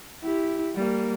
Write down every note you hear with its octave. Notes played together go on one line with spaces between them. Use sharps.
E4 G4
G3 A#3